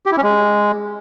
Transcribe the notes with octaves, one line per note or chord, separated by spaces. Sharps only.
G4
E4
C#4
G#3